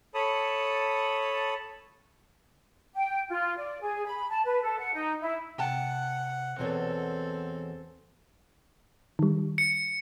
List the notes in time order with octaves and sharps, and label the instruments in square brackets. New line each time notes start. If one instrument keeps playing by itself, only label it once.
[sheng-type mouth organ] A4 C#5 A5 B5 D#6
[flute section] G5
F4
D5
G#4
B5
A5
B4
A4
F#5
D#4
E4
[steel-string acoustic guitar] C3 G5 A5 [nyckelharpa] F#5
[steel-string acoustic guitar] E2 B2 C#5 [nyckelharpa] C4 A4
[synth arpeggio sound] D#3 G3
[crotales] C#7